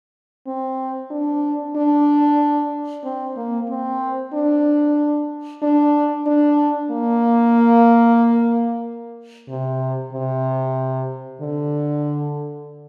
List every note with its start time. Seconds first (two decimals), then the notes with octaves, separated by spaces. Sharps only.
0.47 C4
1.11 D4
1.76 D4
3.04 C4
3.37 A#3
3.69 C4
4.33 D4
5.62 D4
6.26 D4
6.91 A#3
9.48 C3
10.13 C3
11.41 D3